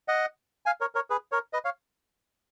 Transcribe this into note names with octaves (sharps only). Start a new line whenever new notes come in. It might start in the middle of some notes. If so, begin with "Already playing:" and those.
D#5 F#5
F5 G#5
A#4 C#5
A#4 C#5
G#4 B4
A#4 C#5
B4 D#5
C#5 F5